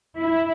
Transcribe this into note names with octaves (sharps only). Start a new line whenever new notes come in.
E4